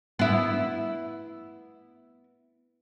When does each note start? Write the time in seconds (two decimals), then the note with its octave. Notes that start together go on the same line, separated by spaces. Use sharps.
0.19 B3 E4